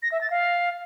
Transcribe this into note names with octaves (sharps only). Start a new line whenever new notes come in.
A#6
E5
A6
F5